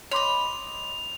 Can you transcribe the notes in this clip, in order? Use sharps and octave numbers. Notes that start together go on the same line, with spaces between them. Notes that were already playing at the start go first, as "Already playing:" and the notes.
C#5 D#5 B5 C6 D6 F7